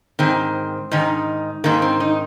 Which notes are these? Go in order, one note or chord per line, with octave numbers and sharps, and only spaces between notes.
G#2 D#3 C4
G#2 D#3 D#4
G#2 D#3 A#3
C4
D#4